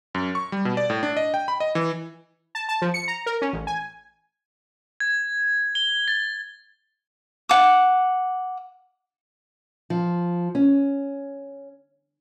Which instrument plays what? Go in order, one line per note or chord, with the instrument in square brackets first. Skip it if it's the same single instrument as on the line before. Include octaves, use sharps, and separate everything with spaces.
[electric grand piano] F#2
C#6
G3
B2
D5
A2
D4
D#5
G5
B5
D#5
E3
[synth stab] A5
A5
F3
C#7
A#5
A#4
C#4
A1
G#5
[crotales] G#6
G7
A6
[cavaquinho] F#5 D6
[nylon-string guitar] F3
C#4